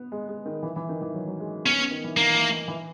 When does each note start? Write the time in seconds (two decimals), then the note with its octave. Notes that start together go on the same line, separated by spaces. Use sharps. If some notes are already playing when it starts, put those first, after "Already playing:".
Already playing: B3
0.12 G#3
0.29 G#3
0.46 D#3
0.63 E3
0.76 E3
0.89 D#3
1.02 E3
1.15 F#3
1.27 F#3
1.40 G#3
1.65 B3 C#4
1.78 B3
1.91 D#3
2.04 E3
2.17 D#3 A#3
2.34 E3
2.50 D#3
2.68 E3